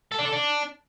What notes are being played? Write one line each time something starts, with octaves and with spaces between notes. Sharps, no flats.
A4
D4
A4
D4